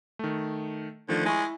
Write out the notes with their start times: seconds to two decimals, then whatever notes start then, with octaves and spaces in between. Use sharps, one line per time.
0.19 D#3 A3
1.09 D3 D#3 F3 A3
1.26 G#3 E4 C#6